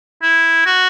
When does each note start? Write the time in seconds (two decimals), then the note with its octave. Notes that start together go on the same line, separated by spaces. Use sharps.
0.22 E4
0.66 F#4